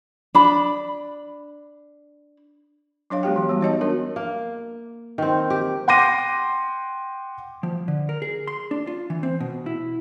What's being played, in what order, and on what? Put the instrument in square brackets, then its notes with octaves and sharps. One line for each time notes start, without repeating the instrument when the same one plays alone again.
[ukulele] D4 B5
[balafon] F#3 D4 C#5 F5
G#3 B3 F#4 G4 G5
E3
G3 B3 F#4
D#4 C#5 D#5 A5
B3 D4 F#4 A#4
[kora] A#3
D#3 C4
G4
[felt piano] F#5 G5 C6 D6 A#6 D#7
[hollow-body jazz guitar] F3
D3
A#4
G#4
C6
D4
F4
E3
C4
B2
E4